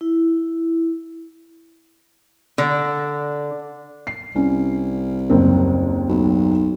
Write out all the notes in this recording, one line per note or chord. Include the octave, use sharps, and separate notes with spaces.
E4
D3
C7
C2 C#4
F#1 D#2 C4
B1